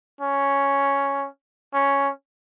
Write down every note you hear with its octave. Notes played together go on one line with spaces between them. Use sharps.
C#4
C#4